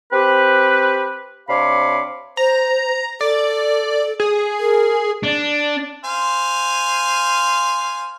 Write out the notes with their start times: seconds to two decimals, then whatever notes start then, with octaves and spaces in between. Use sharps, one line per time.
0.13 C4 G4 B4
1.49 C3 D4 C#5 F5 B5 D6
2.37 C5 A#5
3.21 A4 D5
4.20 G#4
4.59 A#4
5.24 D4
6.04 C5 F5 G#5